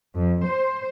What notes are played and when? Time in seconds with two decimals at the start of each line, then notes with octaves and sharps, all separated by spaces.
0.14 F2
0.45 C5